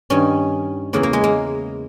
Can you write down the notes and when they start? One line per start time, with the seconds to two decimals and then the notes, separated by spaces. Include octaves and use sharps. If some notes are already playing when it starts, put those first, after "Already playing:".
0.10 G2 D#3 C#4
0.93 E2 C#3 E3 A#3
1.03 A#3
1.13 G#3
1.24 A#3